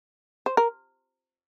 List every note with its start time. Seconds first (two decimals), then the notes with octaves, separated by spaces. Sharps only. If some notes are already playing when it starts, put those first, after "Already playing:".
0.46 C5
0.57 A#4